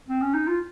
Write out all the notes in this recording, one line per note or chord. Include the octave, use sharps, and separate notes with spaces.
C4
C#4
D#4
F4